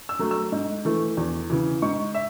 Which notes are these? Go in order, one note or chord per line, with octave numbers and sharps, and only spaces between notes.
E6
F#3 A3
E6
G#2
E3 A3
E2
C#3 E3
G#2 C#6
E5